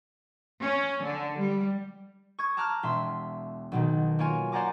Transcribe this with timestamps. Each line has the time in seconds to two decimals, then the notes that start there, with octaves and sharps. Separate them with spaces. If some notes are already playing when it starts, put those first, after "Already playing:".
0.60 C#4
1.02 D3
1.40 G3
2.39 C#6 D#6 G#6
2.57 A5 A#5 D6 F6 F#6
2.83 E1 E5 C6 B6
3.72 B1 B2 D#3
4.19 A#3 F4 C#5 G#5
4.52 C5 D5 F#5 G#5 A#5 D6